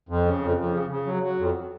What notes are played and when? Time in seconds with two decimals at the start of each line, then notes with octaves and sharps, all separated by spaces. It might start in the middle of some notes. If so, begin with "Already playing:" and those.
0.09 F2
0.26 C#3
0.42 F2
0.57 F2
0.73 C#3
0.90 C#3
1.06 F#3
1.23 F#3
1.39 F2